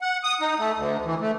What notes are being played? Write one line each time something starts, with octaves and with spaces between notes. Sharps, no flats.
F#5
D#6
D#4
A3
D2
E3
A3